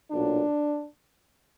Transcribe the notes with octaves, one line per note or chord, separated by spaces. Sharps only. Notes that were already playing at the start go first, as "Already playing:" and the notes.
B1 A#2 F#3 D4